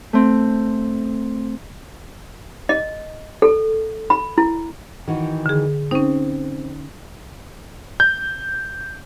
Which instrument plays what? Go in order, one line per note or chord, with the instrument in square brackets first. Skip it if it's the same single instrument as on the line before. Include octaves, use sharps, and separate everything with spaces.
[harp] A3 C4
[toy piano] D#5
A4
B5
E4
[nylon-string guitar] D#3 E3 F#4
[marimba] D3 G#4
[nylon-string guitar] C4 [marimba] C#4 D#4
[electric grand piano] G6